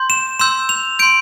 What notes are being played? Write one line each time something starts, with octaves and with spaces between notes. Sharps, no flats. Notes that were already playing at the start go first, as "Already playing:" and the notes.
Already playing: C6 G6
E7
C6 E6 G6 E7
F7
C6 G6 D7